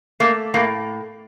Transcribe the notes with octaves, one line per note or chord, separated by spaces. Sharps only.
A3 A#3
A2 A#3